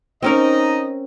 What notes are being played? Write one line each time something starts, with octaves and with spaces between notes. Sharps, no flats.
C4 C#4 D#4 A#4 D#5